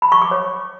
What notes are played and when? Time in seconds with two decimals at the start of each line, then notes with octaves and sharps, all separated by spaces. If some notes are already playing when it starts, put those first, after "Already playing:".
0.02 B5
0.12 C#6
0.22 D6
0.31 C#5